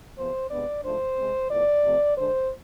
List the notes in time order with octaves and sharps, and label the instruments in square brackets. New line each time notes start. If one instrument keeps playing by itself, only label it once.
[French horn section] E2 C3 F3 B3 C5
C3 G#3 B3 D4 D5
G#2 F3 A3 D4 C5
C3 G#3 C4
A2 F3 B3 D5
C3 F3 A3 C4
D3 G#3 D4 C5